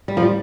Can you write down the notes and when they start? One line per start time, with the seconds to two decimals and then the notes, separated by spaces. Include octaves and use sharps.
0.08 G3
0.17 F3
0.22 G3